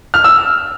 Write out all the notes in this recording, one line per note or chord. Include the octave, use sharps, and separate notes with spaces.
F6
E6